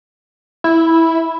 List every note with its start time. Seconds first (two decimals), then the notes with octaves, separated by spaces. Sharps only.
0.64 E4